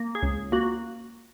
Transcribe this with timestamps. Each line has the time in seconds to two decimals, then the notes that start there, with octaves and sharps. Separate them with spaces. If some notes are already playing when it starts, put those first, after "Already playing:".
Already playing: A#3
0.15 G#4
0.23 C#2
0.52 A#3 F#4